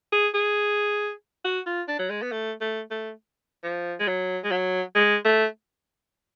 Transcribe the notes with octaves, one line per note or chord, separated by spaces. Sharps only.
G#4
G#4
F#4
F4
D4
F#3
G#3
B3
A3
A3
A3
F3
G#3
F#3
G#3
F#3
G#3
A3